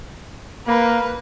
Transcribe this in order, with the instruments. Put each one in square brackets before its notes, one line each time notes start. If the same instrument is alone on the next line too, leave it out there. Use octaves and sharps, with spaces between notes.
[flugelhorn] A#3 [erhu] B4